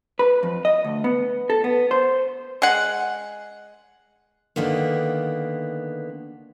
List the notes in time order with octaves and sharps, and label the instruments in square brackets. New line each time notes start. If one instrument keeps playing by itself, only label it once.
[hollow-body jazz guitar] B4
F2
D#5
D2
B3
A4
B3
C5
[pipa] G#3 F#5
[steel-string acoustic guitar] D3 D#3 A#3 B3